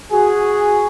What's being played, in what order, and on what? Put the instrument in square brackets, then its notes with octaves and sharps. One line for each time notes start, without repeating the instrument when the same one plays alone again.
[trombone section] F#4 G#4